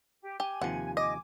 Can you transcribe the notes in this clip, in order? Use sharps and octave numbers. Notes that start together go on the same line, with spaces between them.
G4
G4 G#5
D#2 C3 F3 F#5
D#5 G#5 D6